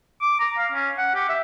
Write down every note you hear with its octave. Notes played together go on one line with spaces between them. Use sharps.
D6
A#5
F5
C#4
F#5
G4
E5